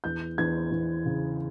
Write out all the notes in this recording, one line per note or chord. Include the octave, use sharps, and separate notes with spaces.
E2 G6
E2 G#6
E2
C#3